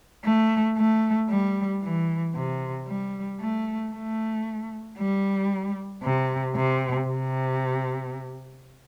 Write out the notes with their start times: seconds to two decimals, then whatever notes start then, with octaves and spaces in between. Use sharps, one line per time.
0.24 A3
0.77 A3
1.29 G3
1.83 E3
2.35 C3
2.87 G3
3.40 A3
3.93 A3
4.98 G3
6.03 C3
6.56 C3
7.07 C3